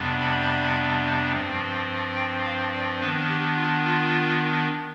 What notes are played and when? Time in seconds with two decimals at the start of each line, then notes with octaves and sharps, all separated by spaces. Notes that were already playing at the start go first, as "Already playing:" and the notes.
Already playing: F2 C3 G3 B3 D4
0.20 B5
1.32 G2 F3 C4
2.16 G5
2.44 F5
2.72 D5
3.00 D#3 B3 D4 B4
3.28 G4
3.56 F4
3.84 F4